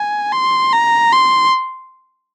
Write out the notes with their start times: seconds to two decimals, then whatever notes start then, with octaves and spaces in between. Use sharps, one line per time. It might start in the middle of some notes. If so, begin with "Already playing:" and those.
Already playing: G#5
0.32 C6
0.73 A#5
1.12 C6